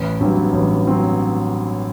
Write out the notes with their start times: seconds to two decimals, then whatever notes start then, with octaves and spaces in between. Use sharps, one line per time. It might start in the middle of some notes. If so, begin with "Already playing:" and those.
Already playing: A1
0.20 G2 F#3 C4
0.53 A1
0.87 F#3 C4